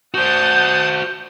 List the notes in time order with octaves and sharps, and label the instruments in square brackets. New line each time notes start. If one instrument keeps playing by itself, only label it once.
[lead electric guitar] F#4 C5 [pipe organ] F#5 A5 D#6 [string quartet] G6